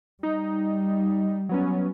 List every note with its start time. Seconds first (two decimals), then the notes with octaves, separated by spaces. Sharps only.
0.23 G3 D#4
1.49 F#3 B3 C#4